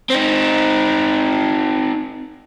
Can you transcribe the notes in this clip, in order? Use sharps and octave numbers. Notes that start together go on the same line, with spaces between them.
C4 D#4